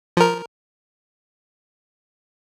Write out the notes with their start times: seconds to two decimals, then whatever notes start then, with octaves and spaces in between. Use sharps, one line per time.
0.17 F3 A#4